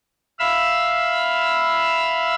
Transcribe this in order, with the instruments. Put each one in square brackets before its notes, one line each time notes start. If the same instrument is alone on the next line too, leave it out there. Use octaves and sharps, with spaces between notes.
[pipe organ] E5 F5 B5 E6